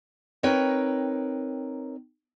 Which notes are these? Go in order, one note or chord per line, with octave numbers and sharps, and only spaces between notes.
C4 D#4 A#4 B4 C#5 G5